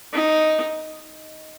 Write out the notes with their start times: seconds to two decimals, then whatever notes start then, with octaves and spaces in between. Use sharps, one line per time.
0.13 D#4